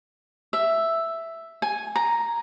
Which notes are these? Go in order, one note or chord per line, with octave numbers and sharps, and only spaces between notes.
E5
G#5
A#5